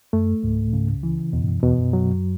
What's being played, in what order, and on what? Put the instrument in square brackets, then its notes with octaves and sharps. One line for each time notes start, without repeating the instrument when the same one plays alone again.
[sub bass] F#2 [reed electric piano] A3
[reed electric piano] C#2 [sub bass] G#2
[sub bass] A2
[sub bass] G#2 [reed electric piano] C#3
[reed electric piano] E3
[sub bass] E2 [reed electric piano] B2
[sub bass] G#2
F#2
[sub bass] E2 [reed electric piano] B2
[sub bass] F#2
[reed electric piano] F#3